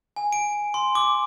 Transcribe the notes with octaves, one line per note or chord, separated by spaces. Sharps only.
G#5
D7
C6
D6